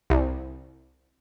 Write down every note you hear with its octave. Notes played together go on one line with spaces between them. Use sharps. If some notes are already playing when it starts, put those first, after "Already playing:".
C2